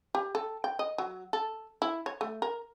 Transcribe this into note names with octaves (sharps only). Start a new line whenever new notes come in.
G4
A4
G5
D#5
F#3
A4
E4
C#5
A3
A#4